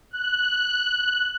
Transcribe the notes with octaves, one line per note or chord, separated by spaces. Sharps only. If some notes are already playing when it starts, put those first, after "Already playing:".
F#6